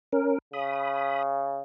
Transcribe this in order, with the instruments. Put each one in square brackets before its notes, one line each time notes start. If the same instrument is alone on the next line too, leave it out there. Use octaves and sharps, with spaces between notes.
[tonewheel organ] C#4 A#4
[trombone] C#3 [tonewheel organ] B5 D#6